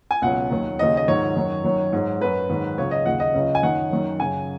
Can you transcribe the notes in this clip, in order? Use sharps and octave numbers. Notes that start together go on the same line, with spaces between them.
G#5
C#2 B2 F#3 F#5
D#2 D#3 F#3
D#2 C#3 F#3 D#5
D#5
G#2 D#3 F#3 C#5
F#2 D#3 F#3
F#2 D#3 F#3
G#2 F#3
F#2 F#3 B4
G#2 D#3 F#3
C#2 C#3 F#3 C#5
D#5
D#2 C#3 F#3 F#5
D#5
C#2 C#3 F#3
G#5
F#2 D#3 F#3 F#5
F#2 D#3 F#3
F#2 C#3 F#3 G#5